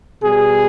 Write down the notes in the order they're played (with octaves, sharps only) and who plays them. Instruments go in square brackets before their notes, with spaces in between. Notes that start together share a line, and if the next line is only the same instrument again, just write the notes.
[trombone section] B2 G3 G#4